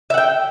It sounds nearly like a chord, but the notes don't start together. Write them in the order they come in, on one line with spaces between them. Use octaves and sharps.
E5 F#5 G5